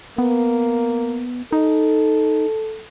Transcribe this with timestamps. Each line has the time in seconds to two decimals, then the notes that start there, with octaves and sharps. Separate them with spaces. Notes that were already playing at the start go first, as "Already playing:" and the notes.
0.18 A#3 B3
1.52 D#4 A4